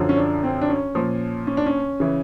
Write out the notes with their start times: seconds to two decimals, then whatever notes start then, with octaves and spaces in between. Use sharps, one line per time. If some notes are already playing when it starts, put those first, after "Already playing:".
Already playing: F#2 D3 F3
0.09 C#4
0.17 D4
0.43 C4
0.61 D4
0.69 C#4
0.95 A#2 F3
1.47 C#4
1.57 D4
1.66 C#4
2.00 C#3 E3